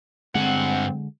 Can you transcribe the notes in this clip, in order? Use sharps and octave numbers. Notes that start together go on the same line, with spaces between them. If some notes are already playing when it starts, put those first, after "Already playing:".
G2 D3 G#3 C4 F#5